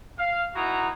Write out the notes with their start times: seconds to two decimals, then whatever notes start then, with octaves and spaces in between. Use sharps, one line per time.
0.19 F5
0.55 B3 D#4 E4 F#4 A#5